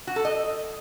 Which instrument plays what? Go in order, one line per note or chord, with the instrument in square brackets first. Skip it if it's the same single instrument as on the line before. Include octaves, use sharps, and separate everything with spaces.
[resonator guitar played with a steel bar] F#4
A4
D#5